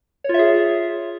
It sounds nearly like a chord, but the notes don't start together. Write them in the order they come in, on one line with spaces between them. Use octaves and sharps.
C#5 F4 E5 G#4